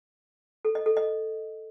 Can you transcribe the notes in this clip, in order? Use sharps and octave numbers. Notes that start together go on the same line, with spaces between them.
A4
D#5
A4
D#5